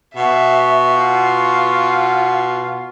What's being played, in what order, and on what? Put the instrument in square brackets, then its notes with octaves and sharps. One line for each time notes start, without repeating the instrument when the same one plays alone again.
[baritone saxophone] B2 [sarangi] E5
[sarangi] F4